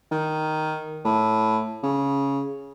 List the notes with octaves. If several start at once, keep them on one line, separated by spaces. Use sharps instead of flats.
D#3
A2
C#3